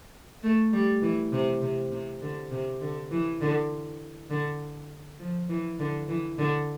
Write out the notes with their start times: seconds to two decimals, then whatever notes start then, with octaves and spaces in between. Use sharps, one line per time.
0.43 A3
0.73 G3
1.02 E3
1.33 C3
1.62 C3
1.92 C3
2.22 D3
2.51 C3
2.81 D3
3.11 E3
3.41 D3
4.30 D3
5.20 F3
5.49 E3
5.79 D3
6.08 E3
6.38 D3